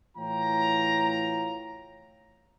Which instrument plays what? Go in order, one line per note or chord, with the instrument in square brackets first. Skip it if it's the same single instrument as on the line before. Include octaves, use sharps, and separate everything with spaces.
[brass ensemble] A2 E3 F4 C#5 G5 A#5